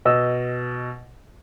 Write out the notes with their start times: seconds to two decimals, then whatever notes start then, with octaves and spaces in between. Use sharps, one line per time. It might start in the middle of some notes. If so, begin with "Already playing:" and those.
0.05 B2 D#5 E6